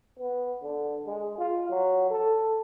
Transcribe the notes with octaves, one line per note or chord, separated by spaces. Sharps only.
B3
D3
G#3
F4
F#3
A4